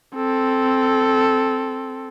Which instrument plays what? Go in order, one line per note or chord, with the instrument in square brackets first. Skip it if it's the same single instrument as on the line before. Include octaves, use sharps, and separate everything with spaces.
[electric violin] C4 A4